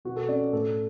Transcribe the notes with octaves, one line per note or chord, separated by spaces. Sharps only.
B2 F#4
A4
C#4 D5
A2 A4